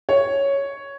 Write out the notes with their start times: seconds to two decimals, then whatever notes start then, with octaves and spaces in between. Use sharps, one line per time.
0.09 C#5